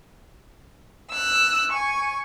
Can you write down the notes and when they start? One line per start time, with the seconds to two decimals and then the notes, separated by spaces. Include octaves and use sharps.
1.11 E6 F#6
1.72 G#5 C#6